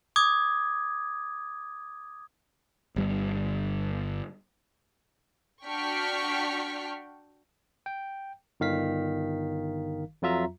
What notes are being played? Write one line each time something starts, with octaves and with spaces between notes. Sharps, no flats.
D6 D#6 G#6
G1 G3
D4 F#4 G5 C#6 F6 B6
G5
G1 D#3 F5 B6
F2 F#3 F4 E5 A#5